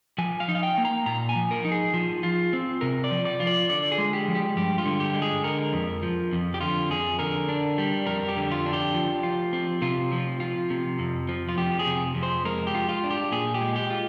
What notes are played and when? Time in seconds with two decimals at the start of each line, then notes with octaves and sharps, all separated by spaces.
0.18 F3 G#5
0.40 F5
0.48 D#4
0.55 F5
0.63 G5
0.78 A#3
0.85 A#5
1.06 A#2 A#5
1.29 G#5
1.36 F3
1.51 A#4
1.65 D#4
1.72 G#4
1.94 F3
2.23 F4
2.53 C4
2.81 C3 A#4
3.04 D5
3.11 F3
3.25 D5
3.40 F4
3.47 D5
3.69 D3 D5
3.92 G#4
3.98 G#3
4.13 G4
4.28 F3
4.35 G4
4.57 G2 G4
4.78 F4
4.86 D3
5.00 G4
5.15 G#3
5.22 G#4
5.44 D3 A#4
5.73 F2
6.03 F3
6.33 F2
6.54 G4
6.61 D3 F4
6.90 F2 G#4
7.19 D3 A#4
7.49 D4
7.78 G3
8.06 F2 A#4
8.28 G4
8.37 D3
8.51 F4
8.66 D4
8.73 G4
8.95 F3
9.23 F4
9.53 C4
9.82 C3 F4
10.12 F3
10.40 F4
10.70 C3
10.99 F2
11.29 F3
11.49 F4
11.57 F2 G4
11.79 G#4
11.87 C3
12.15 F2
12.23 C5
12.45 G#3 A#4
12.67 G4
12.75 F4
12.89 F4
13.04 D4
13.11 G4
13.32 A#2 G#4
13.54 G4
13.61 G#3
13.76 G4
13.90 F4